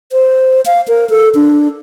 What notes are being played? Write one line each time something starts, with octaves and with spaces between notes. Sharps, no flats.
C5
F5
A#4
A4
D4